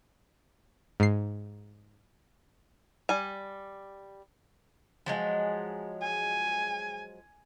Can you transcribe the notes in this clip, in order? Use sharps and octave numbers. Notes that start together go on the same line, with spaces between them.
G#2 C7
G3 G#5
F3 F#3 G#3
G#5